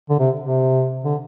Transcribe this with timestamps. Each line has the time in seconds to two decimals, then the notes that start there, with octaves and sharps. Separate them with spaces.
0.10 D3
0.19 C3
0.40 C3
1.05 D3